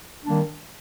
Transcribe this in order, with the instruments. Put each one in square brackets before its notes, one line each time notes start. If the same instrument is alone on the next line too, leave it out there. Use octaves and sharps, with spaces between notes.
[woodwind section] D#3 G3 A#3 D4